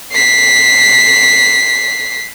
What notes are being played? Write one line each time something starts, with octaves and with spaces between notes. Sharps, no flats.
B6 C7